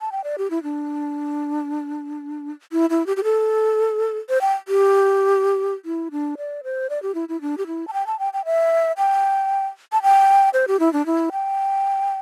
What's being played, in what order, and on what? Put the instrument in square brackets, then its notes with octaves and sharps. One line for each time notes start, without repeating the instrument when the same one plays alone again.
[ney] A5
G5
D5
G4
E4
D4
E4
E4
G4
G4
A4
C5
G5
G4
E4
D4
D5
C5
D5
G4
E4
E4
D4
G4
E4
A5
G5
A5
G5
G5
E5
G5
A5
G5
C5
G4
E4
D4
E4
G5